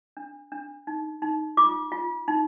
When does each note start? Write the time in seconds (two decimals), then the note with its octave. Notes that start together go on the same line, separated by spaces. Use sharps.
0.17 D4
0.52 D4
0.87 D#4
1.22 D#4
1.57 F4 D6
1.92 F4
2.28 D#4